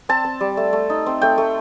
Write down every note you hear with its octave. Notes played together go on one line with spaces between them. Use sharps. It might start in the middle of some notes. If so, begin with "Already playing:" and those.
C4 A5
C4
G3
A3
A3
D#4
C4
A3 G5
A3